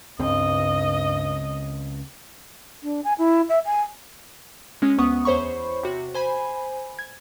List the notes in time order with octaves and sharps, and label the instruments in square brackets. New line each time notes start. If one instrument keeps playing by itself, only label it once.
[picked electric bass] C#2 C#3 C4 [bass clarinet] G2 [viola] D#5
[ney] D4
G#5
E4
E5
G#5
[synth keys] G#3 C#4
D2 B3 F#5 C#6 D#6
E2 C5 C#5 B5 C#6
C3 F#4
C5 G#5 B5
G#6